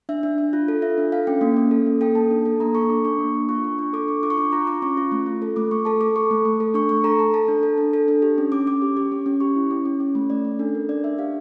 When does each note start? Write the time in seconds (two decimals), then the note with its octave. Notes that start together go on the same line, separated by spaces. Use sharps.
0.09 D4 E5
0.23 D4
0.38 D4
0.53 F4
0.68 A4
0.82 F4 E5
0.98 D4
1.12 A4 F5
1.27 C#4 G5
1.41 A#3
1.57 C#4
1.71 A4
1.86 A#3
2.01 A4 G5
2.15 A#3 A5
2.30 D4
2.45 A4
2.60 A#3 A#5
2.75 A4 C#6
2.90 D4 D6
3.05 D4 C#6
3.19 A#3
3.34 D4
3.49 F4 C#6
3.64 D4 C#6
3.79 D4 C#6
3.93 A4 D6
4.08 D4 C#6
4.23 F4 D6
4.30 C#6
4.37 D4 D6
4.52 F4 A#5
4.67 F4 D6
4.82 C#4 C#6
4.97 F4
5.12 A3
5.26 F4
5.42 A4
5.56 A3 D6
5.71 A3 C#6
5.85 A4 A5
6.01 A4 D6
6.16 A4 C#6
6.31 A3
6.45 A3
6.60 A4
6.74 D4 C#6
6.89 A3 C#6
7.04 A4 A#5
7.19 A4 A5
7.34 A4 A5
7.48 D4
7.63 A4
7.78 D4
7.93 A4
8.08 D4
8.22 G4
8.38 C#4
8.52 C#4 D6
8.67 C#4 D6
8.82 G4
8.97 G4
9.12 C#4
9.26 C#4
9.40 G4 C#6
9.55 E4
9.71 C#4
9.85 C#4
10.00 C#4
10.15 A3
10.30 A3 D5
10.45 C#4
10.59 D4 A4
10.74 D4 A#4
10.89 D4 D5
11.04 D4 E5
11.18 G4 F5